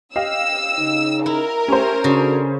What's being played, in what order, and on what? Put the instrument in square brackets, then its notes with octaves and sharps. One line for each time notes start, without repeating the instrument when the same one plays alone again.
[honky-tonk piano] G4 D#5 F5 [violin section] E6
[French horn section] C#3 D#4
[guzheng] E4 [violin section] A#4
[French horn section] A3 G4 [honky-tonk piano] C#4 C5
[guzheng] C#3 [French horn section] D4 F#4 A4